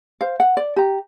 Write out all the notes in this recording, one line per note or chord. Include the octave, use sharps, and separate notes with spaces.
C5 F5
F#5
D5
G4 A#5